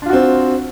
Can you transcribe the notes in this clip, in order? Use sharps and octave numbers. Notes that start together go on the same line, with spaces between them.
C4 D4 F4 F#4